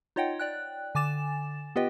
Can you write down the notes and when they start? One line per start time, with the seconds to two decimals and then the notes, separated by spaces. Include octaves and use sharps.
0.16 D#4 F4 C#5 D#5 F#5 G5
0.39 D5 G5 F#6
0.95 D3 G#5 D6 A6 E7
1.76 B3 F4 G4 B4 D#5 G5